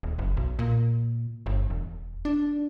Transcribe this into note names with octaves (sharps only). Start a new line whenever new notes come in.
D#1
F#1
B1
A#2
G1
E1
D4